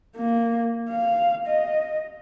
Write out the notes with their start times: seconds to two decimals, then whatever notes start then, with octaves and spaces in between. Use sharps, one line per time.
0.16 A#3
0.90 F5
1.47 D#5